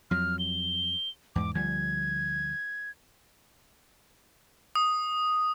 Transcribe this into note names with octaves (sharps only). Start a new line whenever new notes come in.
F2 F#3 F6
G7
E2 G#2 D6
D2 F3 G3 G#6
D#6